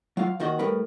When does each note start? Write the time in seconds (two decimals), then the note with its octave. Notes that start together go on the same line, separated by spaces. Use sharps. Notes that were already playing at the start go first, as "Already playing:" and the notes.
0.17 F#3 F4 F5
0.40 D#2 D#3 F#4 D#5
0.59 A2 G3 A#4 B4